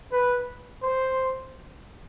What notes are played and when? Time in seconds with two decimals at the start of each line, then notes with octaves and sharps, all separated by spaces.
0.12 B4
0.82 C5